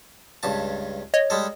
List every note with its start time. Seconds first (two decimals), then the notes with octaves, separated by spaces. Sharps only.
0.43 C#2 G2 A5
1.14 C#5 D#5
1.30 G3 G#3 A4